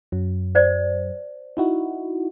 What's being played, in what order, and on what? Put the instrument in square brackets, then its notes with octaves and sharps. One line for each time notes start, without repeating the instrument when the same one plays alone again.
[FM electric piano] F#2 F#3
[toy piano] C5 D5
[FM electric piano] D#4 E4 F#4